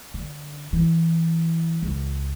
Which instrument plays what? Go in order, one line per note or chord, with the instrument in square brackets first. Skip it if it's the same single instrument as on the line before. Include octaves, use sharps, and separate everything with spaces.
[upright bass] D3
E3
C#2